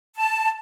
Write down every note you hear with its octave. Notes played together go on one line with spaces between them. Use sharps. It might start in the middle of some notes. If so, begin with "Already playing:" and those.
A5